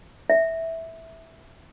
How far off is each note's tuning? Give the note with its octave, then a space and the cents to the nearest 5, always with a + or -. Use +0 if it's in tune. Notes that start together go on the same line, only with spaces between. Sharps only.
E5 -10